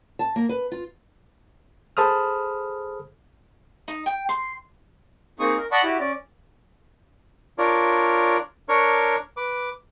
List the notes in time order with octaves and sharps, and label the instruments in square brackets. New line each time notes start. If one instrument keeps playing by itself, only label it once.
[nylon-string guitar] A5
A#3
B4
F4
[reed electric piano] G#4 A4 C5 B5 D#6 F6
[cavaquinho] D#4
G5
C6
[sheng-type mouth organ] A#3 C4 D#4 G#4 C#6 D#6
A#4
D5 D#5 F#5 A5 B5 C#6
E4 F#4 G4
C#4 D5
[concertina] D4 F4 A#4 C#5 D5
D4 A#4 C#5 C#6
B4 D6